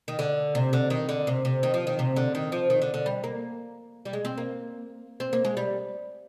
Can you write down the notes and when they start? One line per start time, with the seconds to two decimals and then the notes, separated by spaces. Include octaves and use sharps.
0.08 D#3
0.19 D3
0.55 C3
0.73 D3
0.90 D#3
1.09 D3
1.27 C3
1.45 C3
1.63 D#3
1.74 F3
1.87 D#3
1.99 C3
2.16 D3
2.35 D#3
2.52 F3
2.70 D#3
2.82 D3
2.94 D3
3.06 G3
3.24 A#3
4.05 G3
4.13 G#3
4.25 C4
4.38 A#3
5.20 C4
5.33 A#3
5.45 G#3
5.57 G3